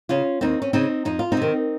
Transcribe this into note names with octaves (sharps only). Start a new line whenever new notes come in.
C#3 C#4 F4
D#2 C4 D#4
C#4
C#3 C4 D#4
F2 D#4
F4
C4 D#4
C3 D#3